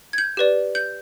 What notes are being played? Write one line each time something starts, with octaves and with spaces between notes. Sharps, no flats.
G#6
G6
G4 B4 D5
G6